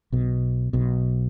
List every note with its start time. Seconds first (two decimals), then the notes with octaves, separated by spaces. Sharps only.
0.12 B1 B2
0.73 B1 B2